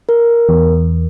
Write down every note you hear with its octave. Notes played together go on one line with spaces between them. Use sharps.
A#4
E2